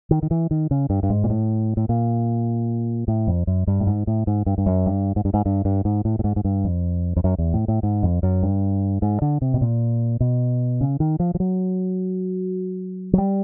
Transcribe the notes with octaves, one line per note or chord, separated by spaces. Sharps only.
D#3
D#3
E3
D#3
C#3
G2
G2
G#2
A#2
A2
A2
A#2
A2
F2
F#2
G2
A2
G#2
A2
G#2
G2
G2
F#2
G2
G#2
G2
G#2
G2
G2
G#2
A2
A2
G#2
G#2
G2
F2
F2
F#2
E2
A2
A2
G#2
F2
F#2
G2
G#2
D3
C3
B2
A#2
B2
C#3
D#3
F3
F3
F#3
F#3
G3